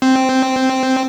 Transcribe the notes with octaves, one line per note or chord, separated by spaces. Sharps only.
C4